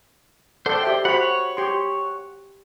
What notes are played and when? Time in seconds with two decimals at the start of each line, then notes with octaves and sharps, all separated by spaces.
0.66 A4 C5 D5 F#5 G5
0.84 G4 D5 E5
1.05 F#4 C5 C#5 F#5 B5
1.57 G4 C6